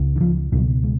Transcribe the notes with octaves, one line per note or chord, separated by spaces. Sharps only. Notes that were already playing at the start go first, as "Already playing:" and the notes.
Already playing: C#2 C#3
D#3
F3
C#2 B2 F#3
G#3